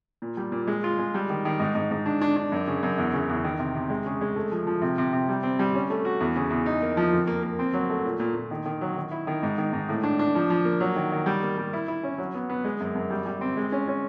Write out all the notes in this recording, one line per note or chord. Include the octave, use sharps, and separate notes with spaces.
A#2
G3
A#2
G#3
F4
G#3
G3
D#3
D#3
G#2
G#2
G#2
D4
D4
D4
F#2
C#3
F#2
E2
C#3
E2
D#3
C3
C3
G#3
C#3
G#3
A3
F3
F3
C3
C3
C3
G3
C4
G3
C#4
A3
F#4
E2
C#3
E2
D#4
A#3
F3
F2
A#3
A#3
C4
F#3
A3
A#2
A#2
A#2
D#3
D#3
F#3
D#3
E4
D#3
G#2
D#3
G#2
A2
D4
D4
F3
F3
A#3
F#3
D#3
D#3
G3
A#3
G3
E4
E4
C#4
F#3
B3
B3
G#3
F#2
F#2
G3
G3
C4
G#3
C#4
C#4